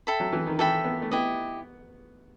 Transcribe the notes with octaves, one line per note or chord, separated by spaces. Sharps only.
A4 E5 G5 B5
F#3
E3
D#3
E3 A4 E5 G5 B5
B3
A3
B3 E4 G4 D#5